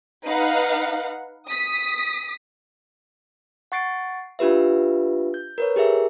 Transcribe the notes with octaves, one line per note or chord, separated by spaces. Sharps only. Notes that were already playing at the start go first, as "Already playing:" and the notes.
D#4 B4 F5 F#5
D#6 B6
F#5 C#6 A6 C7 D7
D4 F4 G4 B4 E5
G6
A#4 B4 C#5
G4 G#4 A#4 E5